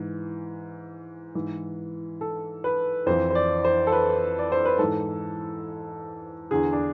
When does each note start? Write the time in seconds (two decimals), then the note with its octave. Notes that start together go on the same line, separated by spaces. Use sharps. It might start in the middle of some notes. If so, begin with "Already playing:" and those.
Already playing: G#2 E3
1.35 G#2 E3
2.21 A4
2.64 B4
3.06 F2 E3 C5
3.30 C5
3.35 D5
3.65 C5
3.87 A4
3.92 B4
4.39 D5
4.52 C5
4.65 B4
4.79 G#2 E3 A4
6.51 E2 D3 G#4
6.73 D4